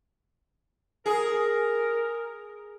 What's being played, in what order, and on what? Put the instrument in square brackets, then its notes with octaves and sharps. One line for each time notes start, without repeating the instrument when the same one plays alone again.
[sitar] G#4 [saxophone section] A#4